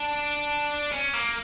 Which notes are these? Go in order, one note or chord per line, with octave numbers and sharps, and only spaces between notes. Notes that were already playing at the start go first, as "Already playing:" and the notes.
Already playing: D4
C#4
A#3